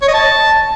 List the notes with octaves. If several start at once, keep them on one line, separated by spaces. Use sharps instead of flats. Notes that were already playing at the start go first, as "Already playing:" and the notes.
C#5
D#5
A5